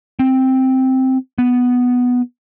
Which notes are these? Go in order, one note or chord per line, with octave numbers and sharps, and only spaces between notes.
C4
B3